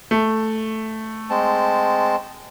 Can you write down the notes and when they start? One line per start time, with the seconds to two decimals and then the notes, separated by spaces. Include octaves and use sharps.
0.11 A3
1.30 G#3 C4 A5